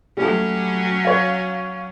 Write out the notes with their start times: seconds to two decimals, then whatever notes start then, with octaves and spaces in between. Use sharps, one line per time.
0.17 F#3 G3 A3 C#4
1.05 C#5 F5